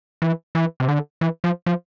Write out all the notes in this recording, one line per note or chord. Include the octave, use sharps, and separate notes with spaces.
E3
E3
C3
D3
E3
F3
F3